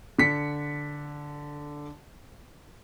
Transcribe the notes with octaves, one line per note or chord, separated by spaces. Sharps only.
D3 B6 C#7